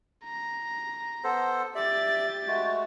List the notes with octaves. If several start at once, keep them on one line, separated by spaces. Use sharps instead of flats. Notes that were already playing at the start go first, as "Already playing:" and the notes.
A#5
B3 A4 C5
G4 D5 E5 A6
G#3 A3 F#4